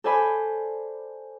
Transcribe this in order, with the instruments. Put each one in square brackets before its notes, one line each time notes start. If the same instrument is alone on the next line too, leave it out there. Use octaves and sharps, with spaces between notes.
[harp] A4 C5 D5 G#5 B5